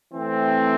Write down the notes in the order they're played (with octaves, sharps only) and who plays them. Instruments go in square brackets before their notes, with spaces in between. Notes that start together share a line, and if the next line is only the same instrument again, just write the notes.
[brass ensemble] E3 A3 C4